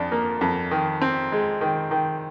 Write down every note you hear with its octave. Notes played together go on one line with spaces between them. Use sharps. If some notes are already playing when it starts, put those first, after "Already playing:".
Already playing: F2 D4
A#3
F2
D#3
C4
G#3
D#3
D#3